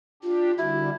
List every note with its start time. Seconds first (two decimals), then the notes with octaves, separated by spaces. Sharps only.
0.23 D4 F4 G4
0.58 D3 G3 E4 F#4